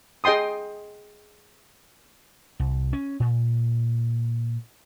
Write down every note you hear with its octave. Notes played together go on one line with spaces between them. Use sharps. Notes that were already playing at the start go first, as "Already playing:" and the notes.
G#4 D#5 G5 C6 D#6
C2
C#4
A#2